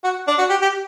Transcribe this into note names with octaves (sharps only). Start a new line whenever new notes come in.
F#4
D4
F#4
G4
G4